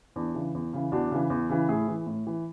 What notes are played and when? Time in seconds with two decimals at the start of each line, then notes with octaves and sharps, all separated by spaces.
0.16 E2 D4
0.35 C#3 E3
0.55 E2
0.73 C#3 E3
0.92 E2 D4 F#4
1.11 C#3 E3
1.30 E2
1.49 C#3 E3
1.68 A2 E4 G#4
1.88 E3
2.06 A2
2.27 E3